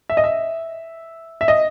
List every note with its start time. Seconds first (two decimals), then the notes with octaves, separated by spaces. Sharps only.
0.10 E5
0.17 D#5
0.24 E5
1.41 E5
1.48 D#5